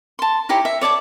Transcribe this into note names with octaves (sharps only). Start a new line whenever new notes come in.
A5 C6
D#4 E4 G4 C#5
E5
C#5 D5 G#5 A5